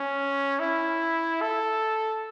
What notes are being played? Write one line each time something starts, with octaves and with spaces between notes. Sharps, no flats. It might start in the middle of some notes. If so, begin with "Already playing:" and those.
Already playing: C#4
E4
A4